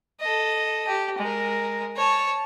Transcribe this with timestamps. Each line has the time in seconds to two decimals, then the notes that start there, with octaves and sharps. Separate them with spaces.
0.20 A4 D#5
0.87 G4
1.18 G#3 A#4
1.96 C#5 A5